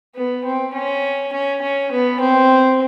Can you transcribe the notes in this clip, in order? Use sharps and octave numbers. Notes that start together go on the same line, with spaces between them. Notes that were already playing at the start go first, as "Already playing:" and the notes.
B3
C4
C#4
C#4
C#4
B3
C4